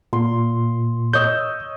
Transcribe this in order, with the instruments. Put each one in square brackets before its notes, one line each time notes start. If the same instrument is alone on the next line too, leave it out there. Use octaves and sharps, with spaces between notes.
[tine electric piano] A#2 [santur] C6
[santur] C#5 D#5 E6 [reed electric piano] G6